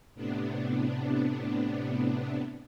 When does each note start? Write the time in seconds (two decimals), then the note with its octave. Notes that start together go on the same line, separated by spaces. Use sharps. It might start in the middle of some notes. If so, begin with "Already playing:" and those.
0.15 A2 C3 B3 D4